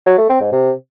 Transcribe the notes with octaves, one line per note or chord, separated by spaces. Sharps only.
F#3
A3
C4
G#2
C3